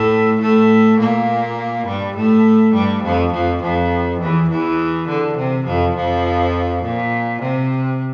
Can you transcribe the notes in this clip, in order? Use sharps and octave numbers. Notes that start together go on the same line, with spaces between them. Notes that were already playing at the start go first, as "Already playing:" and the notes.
Already playing: A2 A3
A2 A3
A#2 A#3
G2 G3
A2 A3
G2 G3
F2 F3
F2 F3
F2 F3
E2 E3
E2 E3
D3
C3
F2 F3
F2 F3
A#2
C3